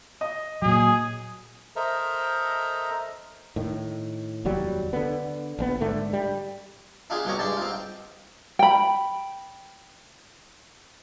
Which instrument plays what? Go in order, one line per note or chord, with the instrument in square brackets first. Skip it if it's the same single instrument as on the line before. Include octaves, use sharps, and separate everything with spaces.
[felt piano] D#5
[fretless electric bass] A#2 F#3 [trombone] G#4
[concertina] A4 A#4 C5 D#5 E5 A#5
[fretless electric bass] A2 D#3
F1 D#2 F#3 G3
D3 B3
A#1 C#3 B3
G#2 D3 A3
G3
[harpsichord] D4 D#4 F4 G4 G#4
C2 B2 D#4 G4 C#5 A#5
G2 G#3 G4 D5 A5
C4 D#4 F4
G5
[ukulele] G5 B5